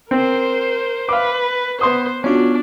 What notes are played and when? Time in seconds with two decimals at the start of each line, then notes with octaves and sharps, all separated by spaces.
0.11 C4 A#4 C5
1.09 B4 F5 D6
1.81 B3 C5 C6 D#6
2.24 B3 C#4 D4 F4 F#4